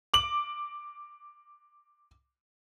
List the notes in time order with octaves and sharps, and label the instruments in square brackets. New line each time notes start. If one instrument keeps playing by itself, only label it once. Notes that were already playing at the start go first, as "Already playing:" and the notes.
[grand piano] D6 F#7